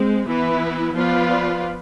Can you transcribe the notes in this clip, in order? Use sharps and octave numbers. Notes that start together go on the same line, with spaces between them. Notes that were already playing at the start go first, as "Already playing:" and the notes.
Already playing: G#3 C4
E3 B3 E4 B4
F3 B3 F4 B4 D5